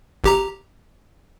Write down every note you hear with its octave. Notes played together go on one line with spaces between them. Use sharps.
G#1 G4 A#5